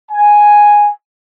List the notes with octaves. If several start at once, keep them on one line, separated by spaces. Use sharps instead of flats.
G#5